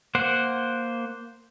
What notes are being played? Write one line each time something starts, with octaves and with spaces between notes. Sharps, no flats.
A#3 C5 F#5